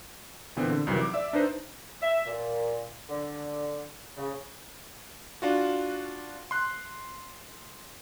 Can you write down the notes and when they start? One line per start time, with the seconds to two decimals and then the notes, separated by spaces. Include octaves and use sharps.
0.56 A#2 D3 E3 B3 C4
0.70 D3
0.87 C2 F2 D#3 E3 F#3
1.01 D6
1.14 D5 E5 E6
1.33 D4 D#4 B4 C5
2.02 E5
2.27 A#2
3.09 D3
4.17 C#3
5.42 D4 F4 F#4
6.51 C6 F#6